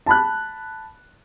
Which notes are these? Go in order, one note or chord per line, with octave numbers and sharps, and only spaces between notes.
A5 B5 F#6